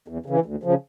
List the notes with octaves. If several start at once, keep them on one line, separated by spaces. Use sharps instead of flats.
E2
C#3 E3
D2
C#3 F3